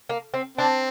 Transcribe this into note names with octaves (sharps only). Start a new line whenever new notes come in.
A#3
C4
C4 D4